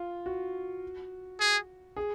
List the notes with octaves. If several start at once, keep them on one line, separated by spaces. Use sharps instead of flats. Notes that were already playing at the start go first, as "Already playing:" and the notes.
Already playing: F4
F#4
G#4
G#4